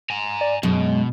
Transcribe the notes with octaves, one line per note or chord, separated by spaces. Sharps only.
G#5 A#5
D5
F#2 B2 G#3